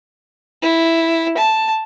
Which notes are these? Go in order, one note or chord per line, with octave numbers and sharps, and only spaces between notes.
E4
A5